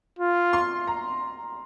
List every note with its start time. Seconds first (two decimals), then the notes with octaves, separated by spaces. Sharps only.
0.19 F4
0.53 C6
0.87 A#5